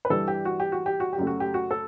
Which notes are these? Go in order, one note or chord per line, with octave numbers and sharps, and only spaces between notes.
B4
G2 E3 G3 A4
G4
F#4
G4
F#4
G4
F#4
G4
F#2 C#3 F#3 A3
F#4
G4
F#4
A4